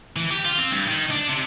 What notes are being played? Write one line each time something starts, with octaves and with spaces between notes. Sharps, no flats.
E3
G4
F4
C4
G2
D#3
D4
C3